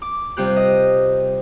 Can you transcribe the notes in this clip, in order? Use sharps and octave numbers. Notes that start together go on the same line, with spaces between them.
D6
C3 G3 F4 G4 F#6
D#5